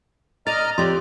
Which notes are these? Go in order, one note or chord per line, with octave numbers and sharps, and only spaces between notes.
D5 D#5 A#5 F6 A6
F2 F4 G4 C#5 D5 C6